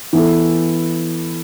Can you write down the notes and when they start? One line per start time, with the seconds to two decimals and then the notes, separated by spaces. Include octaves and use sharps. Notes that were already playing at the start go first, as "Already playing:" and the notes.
0.13 E3 B3 E4 A4